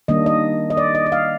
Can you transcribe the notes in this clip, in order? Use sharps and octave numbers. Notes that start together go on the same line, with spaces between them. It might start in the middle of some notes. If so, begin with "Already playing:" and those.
D#3 G3 A#3 D4 D#5
D#5
D#5
D5
D#5
D#5
F5